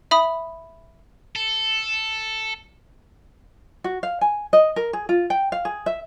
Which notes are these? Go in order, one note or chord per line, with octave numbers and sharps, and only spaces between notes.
E5 B5 D#6
A4
F#4
F5
G#5
D#5
A#4
G#4
F4
G5
F5
G#4
E5